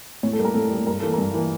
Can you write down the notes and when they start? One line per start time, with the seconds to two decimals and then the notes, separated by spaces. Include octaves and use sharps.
0.23 A2 C#5
0.33 A4
0.39 G3 A#3
0.45 A#4
0.54 A2 A4
0.71 G3 A#3
0.87 G2 A#4
1.00 E3 A#3 A4
1.13 G2 A#4
1.34 E3 A#3